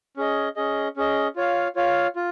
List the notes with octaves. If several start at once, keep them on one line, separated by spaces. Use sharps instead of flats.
C#4 G#4 D#5
C#4 G#4 D#5
C#4 G#4 D#5
F4 C#5 F5
F4 C#5 F5
F4